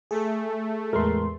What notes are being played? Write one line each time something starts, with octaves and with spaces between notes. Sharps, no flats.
A3 G#4 A4
E2 A2 G#3 A#4 C6